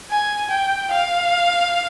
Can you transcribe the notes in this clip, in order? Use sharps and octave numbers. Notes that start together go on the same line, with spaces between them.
G#5
G5
F5